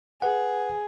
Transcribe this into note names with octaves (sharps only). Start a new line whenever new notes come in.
G#4 B4 F#5